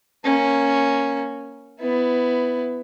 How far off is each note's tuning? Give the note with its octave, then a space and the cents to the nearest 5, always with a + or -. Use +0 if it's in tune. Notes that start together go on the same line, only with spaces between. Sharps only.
A#3 +0 C#4 +0
B3 +20 E4 +5